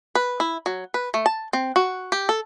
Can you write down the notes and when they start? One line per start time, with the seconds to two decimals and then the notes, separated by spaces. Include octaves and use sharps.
0.15 B4
0.40 E4
0.66 F#3
0.94 B4
1.14 A3
1.26 A5
1.53 C4
1.76 F#4
2.12 G4
2.29 A4